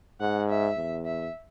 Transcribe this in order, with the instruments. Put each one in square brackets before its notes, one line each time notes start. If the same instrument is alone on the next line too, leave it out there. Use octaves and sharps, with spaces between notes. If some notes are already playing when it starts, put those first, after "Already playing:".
[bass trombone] G#2 [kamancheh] F#5
[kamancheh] E5
[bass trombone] E2
[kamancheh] E5